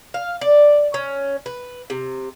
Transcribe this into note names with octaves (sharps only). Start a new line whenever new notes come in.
F5
D5
C#4
B4
C3